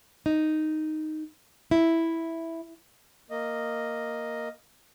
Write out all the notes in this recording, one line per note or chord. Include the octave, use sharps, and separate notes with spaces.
D#4
E4
A#3 D#5